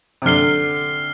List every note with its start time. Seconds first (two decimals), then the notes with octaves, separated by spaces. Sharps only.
0.22 C3
0.26 D3 F6 C7 G7